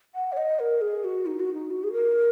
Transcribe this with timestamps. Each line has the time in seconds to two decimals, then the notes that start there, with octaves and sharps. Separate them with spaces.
0.15 F#5
0.32 C#5
0.37 D#5
0.59 A#4
0.81 G#4
1.04 F#4
1.26 D#4
1.40 F#4
1.54 D#4
1.71 F#4
1.84 G#4
1.93 A#4